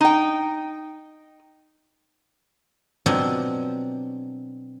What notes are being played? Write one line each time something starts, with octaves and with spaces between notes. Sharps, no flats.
D#4 G5
B2 F3 F#3 C4 D4 D#5